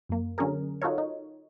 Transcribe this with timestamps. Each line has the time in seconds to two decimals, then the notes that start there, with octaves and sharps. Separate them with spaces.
0.09 F#2 A#3
0.38 D3 F#3 C#4 D4 G#4 A#4
0.82 D#4 F4 F#4 A4 A#4 C#5
0.98 D#4